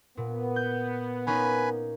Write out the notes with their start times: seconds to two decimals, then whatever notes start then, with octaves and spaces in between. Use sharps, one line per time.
0.17 A#2 B3
0.56 G6
1.27 A#3 C#4 D#4 B4 G#5 B5